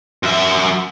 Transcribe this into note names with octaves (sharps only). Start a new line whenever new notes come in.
F#2 E5